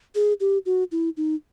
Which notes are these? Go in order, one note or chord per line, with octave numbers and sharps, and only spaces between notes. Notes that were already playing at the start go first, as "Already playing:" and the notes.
G#4
G4
F#4
E4
D#4